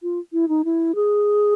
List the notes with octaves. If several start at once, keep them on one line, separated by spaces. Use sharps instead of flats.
F4
E4
D#4
E4
G#4